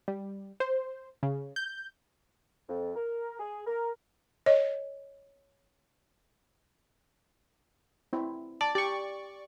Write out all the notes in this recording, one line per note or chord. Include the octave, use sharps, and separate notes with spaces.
G3
C5
C#3
G6
F2
A#4
G#4
A#4
C#5 D#5
C4 E4
D5 A5
G4 D5 C#6